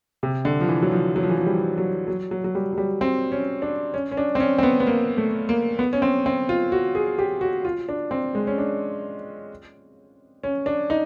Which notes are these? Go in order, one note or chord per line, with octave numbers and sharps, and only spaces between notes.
C3
D3
F3
E3
F#3
F3
F#3
F3
E3
F3
G3
F#3
F#3
F#3
F#3
G3
F#3
G3
C4
C#4
D4
C#4
C#4
D4
C4
C#4
C4
B3
B3
A#3
A3
A#3
B3
C#4
C4
C4
F4
F#4
G#4
G4
F#4
F4
D4
C4
G#3
C#4
D4
C#4
D4
D#4